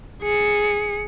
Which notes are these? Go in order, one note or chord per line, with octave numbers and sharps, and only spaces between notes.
G#4 C#7